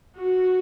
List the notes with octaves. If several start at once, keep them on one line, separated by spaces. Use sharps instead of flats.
F#4